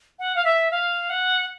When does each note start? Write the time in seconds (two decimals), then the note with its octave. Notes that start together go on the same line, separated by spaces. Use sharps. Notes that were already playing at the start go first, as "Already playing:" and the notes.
0.19 F#5
0.35 F5
0.45 E5
0.71 F5
1.10 F#5